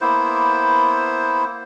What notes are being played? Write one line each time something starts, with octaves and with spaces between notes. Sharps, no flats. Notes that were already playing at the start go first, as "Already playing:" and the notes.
A#3 B3 E4 C5